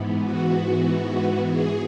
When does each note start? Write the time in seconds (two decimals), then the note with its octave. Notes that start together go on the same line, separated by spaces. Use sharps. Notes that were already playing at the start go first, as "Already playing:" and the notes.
Already playing: G#2 E3 B3
0.23 F#4
1.50 G#4